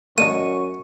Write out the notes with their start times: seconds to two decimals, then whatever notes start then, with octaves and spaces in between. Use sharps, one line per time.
0.18 F#2 A3 D4 D#4 C#6 D#7